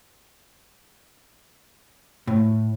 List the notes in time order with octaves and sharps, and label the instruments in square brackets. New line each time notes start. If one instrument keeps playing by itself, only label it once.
[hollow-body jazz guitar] A2